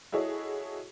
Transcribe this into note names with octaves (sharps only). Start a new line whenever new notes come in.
E4 F#4 G#4 A4 C#5 D#5